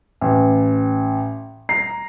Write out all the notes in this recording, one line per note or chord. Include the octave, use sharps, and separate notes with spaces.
A1
A#5 C7